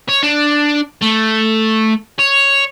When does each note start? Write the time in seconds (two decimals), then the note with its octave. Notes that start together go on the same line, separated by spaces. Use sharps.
0.09 C#5
0.23 D4
1.01 A3
2.19 C#5